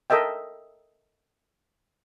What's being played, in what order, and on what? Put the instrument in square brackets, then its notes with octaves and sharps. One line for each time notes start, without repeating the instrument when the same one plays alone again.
[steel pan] A4 A#4 D#5 E5 G5